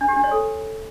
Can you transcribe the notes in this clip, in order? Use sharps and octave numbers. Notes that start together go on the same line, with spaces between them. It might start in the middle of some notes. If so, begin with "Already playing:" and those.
D4
G4
D4
C#5
A4